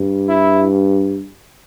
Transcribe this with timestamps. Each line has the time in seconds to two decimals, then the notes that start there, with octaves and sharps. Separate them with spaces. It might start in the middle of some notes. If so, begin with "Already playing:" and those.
Already playing: G2
0.28 E4